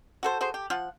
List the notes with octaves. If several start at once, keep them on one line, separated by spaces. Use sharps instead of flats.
F#4 A4 C5
F#4 G#4 C5
G4
F3 F4 F#5